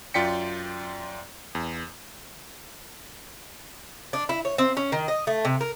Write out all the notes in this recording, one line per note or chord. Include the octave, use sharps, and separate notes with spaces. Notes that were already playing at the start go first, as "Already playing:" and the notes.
F#2 F4 D5 G5 B6 C#7
E2
D4
E4
C#5
C4
C#4
D#3
D#5
A3
C3
A#4